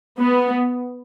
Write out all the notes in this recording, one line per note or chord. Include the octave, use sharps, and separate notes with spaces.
B3